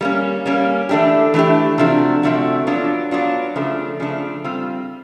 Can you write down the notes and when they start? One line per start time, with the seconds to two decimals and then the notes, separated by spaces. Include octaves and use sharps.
0.01 G3 A#3 C#4
0.46 G3 A#3 C#4
0.89 E3 A3 D4 G4
1.34 E3 A3 D4 G4
1.78 C3 F3 A3 D4 F#4
2.23 C3 F3 A3 D4 F#4
2.67 F#3 B3 D4 F4
3.11 F#3 B3 D4 F4
3.56 C#3 F3 A3 D4
4.00 C#3 F3 A3 D4
4.44 G3 C4 F4